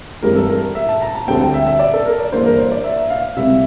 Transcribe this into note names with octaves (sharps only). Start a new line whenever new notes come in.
G2 E3 G3 C4 A#4
A4
A#4
E5
A5
A#5
A5
D2 D3 G3 C4 G5
G5
E5
E5
D5
A4
A#4
D5
G2 E3 A#3 D4 C5
A#4
C5
D5
E5
F5
C2 C3 G3 E5